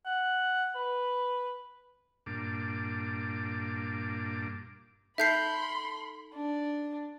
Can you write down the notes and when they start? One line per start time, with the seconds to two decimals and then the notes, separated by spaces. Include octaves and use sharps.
0.06 F#5
0.75 B4
2.26 G2 A#2 D4 D6
5.18 D#4 A4 E5 A5 B5 C6 G6 C7
6.35 D4